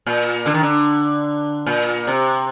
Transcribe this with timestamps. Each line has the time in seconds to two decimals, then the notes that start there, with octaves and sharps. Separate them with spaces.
0.06 A#2
0.46 D3
0.54 D#3
0.63 D3
1.66 A#2
2.07 C3